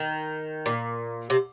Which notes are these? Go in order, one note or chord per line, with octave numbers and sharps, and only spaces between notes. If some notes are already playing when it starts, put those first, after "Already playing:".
Already playing: D#3
A#2
C3